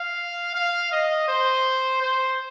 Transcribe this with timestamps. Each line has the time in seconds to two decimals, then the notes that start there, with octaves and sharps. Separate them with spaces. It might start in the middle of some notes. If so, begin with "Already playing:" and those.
Already playing: F5
0.55 F5
0.92 D#5
1.28 C5
2.01 C5